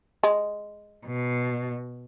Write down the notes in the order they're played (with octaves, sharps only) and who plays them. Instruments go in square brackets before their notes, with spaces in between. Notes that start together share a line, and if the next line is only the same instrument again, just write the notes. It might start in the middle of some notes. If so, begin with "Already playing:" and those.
[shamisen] G#3
[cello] B2